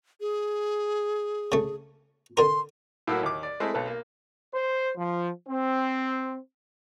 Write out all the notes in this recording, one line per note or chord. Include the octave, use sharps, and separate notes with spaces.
G#4
C#3 A3
D3 A#4 C6
A2 F#3 A#3 E4 F#4
D#2 D6
D5
G#3 A3 C4 E4
B1 A4 B4
A#3
C5
F3
C4